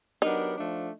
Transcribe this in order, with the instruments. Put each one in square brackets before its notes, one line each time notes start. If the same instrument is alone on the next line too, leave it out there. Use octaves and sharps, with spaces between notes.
[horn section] F#3 B3 D4 G4 A#4 [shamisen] D#4
[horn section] F3 A3 D4